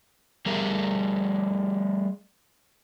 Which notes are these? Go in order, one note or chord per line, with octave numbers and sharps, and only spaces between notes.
G3 A3 G#4 A#4